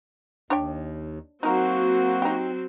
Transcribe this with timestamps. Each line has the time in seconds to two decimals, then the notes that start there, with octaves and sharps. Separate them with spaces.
0.50 D#2 D4 C#5 G5
1.43 F#3 A#3 C4 D#4 F#4 A#4
2.22 D#4 G4